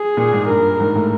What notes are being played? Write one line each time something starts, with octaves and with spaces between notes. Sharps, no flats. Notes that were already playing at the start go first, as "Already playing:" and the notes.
Already playing: G#4
A#2
G#2
G2 A#4
G#2
A2